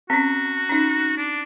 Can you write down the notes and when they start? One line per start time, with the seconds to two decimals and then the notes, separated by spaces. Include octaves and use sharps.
0.10 C4 C#4 F#4
0.69 C#4 D#4
1.18 D4